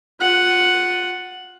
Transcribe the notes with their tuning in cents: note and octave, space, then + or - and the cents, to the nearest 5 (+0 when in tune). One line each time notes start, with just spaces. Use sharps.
F4 +25 F#5 +0